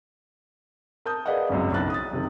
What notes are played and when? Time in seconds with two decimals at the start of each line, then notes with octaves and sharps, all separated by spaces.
1.06 A#4 A5 D#6 G6
1.26 G#4 B4 D5 D#5 F5 F#5
1.49 G#1 C#2 F#2
1.72 B1 C#3 E4 A5 F#6 A6
1.90 D#6 A6
2.11 F#1 C3 D#3